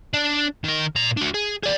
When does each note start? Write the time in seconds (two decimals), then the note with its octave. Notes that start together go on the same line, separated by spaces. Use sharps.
0.14 D4
0.64 D#3 A#4
0.96 A#2 A#5
1.17 D4 F#4
1.34 G#4
1.63 G#4 D5